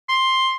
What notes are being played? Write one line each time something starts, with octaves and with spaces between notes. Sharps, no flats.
C6